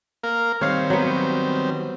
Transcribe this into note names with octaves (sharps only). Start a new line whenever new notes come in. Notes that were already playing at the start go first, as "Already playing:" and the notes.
A#3 A#4 F5
D#3 G3 C4 C#5 F5
F#3 B3